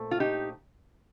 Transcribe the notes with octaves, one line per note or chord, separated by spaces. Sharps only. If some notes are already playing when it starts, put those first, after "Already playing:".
Already playing: A#2 A3 C4
F4
D#4 G4